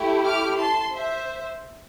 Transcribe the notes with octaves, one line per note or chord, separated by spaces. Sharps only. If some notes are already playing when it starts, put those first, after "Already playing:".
Already playing: A3 E4 G4
D6 F6
A5 C6
C5 E5